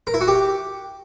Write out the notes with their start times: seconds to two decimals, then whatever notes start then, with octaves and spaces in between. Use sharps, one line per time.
0.07 A#4
0.14 E4
0.21 F#4
0.28 G4